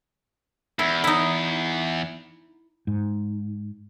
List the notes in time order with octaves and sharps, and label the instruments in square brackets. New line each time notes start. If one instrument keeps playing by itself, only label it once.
[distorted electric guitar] E2 [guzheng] E4
[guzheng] D#4 E4
[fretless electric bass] G#2